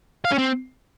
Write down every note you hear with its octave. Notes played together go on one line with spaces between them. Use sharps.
F5
C#4
C4